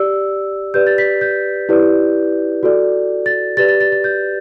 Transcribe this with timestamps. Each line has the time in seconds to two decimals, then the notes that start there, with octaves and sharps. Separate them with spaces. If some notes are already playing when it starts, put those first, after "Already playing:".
Already playing: G4 D5 E6
0.74 G4 B4 D5 G6
0.87 A6
0.98 B6
1.21 G6
1.69 E4 G4 B4 D5
2.63 F#4 A4 D5
3.26 A6
3.57 G4 B4 D5 A6
3.69 A6
3.81 A6
3.92 A6
4.04 G6